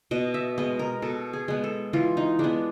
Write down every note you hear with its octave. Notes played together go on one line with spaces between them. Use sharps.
B2 D#5
E5
G#3 B3 D#5
A#4
B2 A4
G#4
G#3 B3
A4
E3 F4
D#4
G#3 B3 D4